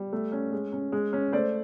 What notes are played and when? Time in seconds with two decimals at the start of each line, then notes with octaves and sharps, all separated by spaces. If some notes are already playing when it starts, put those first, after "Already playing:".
Already playing: G3
0.13 A3
0.32 C#4
0.52 G#3
0.73 C#4
0.92 G#3
1.13 C#4
1.33 A3 C5 D5